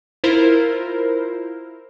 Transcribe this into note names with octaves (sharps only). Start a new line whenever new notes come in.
E4 F4 A#4 C5